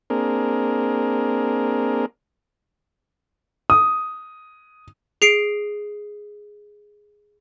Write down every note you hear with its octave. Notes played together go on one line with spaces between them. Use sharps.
A#3 C4 D4 G#4 A#4
D#6
G#4 C7 D7